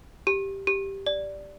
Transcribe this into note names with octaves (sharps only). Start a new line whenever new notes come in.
G4
G4
D5